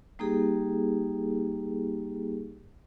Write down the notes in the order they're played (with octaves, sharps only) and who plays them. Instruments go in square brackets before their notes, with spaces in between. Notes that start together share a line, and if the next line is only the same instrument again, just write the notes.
[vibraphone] G3 A#3 D#4 G4 G#4